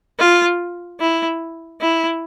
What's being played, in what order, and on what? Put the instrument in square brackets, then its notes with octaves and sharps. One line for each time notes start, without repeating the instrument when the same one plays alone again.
[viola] F4
E4
E4